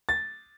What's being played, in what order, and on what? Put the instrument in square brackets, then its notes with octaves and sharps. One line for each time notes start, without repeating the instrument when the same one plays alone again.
[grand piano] A6